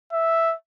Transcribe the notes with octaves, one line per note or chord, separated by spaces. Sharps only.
E5